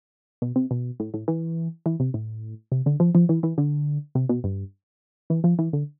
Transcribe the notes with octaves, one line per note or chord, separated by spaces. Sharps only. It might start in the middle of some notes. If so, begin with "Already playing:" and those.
B2
C3
B2
A2
A2
E3
E3
C3
A2
C3
D3
F3
F3
E3
E3
D3
C3
B2
G2
E3
F3
E3
D3